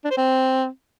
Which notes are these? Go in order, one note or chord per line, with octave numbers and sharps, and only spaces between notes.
D4
C5
C4